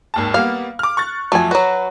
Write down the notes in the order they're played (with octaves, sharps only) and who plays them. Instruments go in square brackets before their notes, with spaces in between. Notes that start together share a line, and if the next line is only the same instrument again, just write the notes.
[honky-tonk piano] G#1 D#2 A5
[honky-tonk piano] G3 A#3 B3 [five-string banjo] F5
[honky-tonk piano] D6 F6
C#6 F#6 A6
[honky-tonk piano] F2 F3 F#3 [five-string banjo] A3 G#5
[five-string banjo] F#3 F#4 [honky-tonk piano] B4